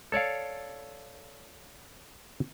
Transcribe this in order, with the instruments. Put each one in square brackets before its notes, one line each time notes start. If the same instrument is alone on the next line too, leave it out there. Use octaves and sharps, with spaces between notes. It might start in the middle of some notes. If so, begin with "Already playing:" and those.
[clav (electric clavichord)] A4 C#5 D5 F5